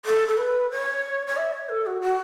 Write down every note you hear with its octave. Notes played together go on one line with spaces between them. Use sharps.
A4
A4
B4
C#5
C#5
E5
C#5
A4
F#4
F#4